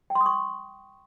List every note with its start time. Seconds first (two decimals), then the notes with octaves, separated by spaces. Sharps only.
0.10 G5
0.15 C6
0.21 D#6
0.26 C#6